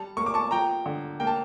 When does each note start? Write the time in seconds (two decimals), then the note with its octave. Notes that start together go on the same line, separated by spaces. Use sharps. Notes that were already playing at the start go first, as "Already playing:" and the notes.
Already playing: G3 A5
0.17 A#3 C#6
0.26 D6
0.34 A5 C#6
0.51 F3 G5 A#5
0.86 D3
1.20 A#3 G5
1.27 A5